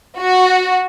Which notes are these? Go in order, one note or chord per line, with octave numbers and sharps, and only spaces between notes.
F#4